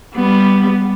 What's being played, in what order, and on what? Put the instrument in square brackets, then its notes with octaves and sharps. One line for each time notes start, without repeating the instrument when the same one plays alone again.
[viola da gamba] G3 B3